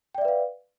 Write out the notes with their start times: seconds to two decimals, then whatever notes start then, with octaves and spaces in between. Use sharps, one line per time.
0.15 G5
0.18 D5
0.21 E5
0.25 B4
0.28 F5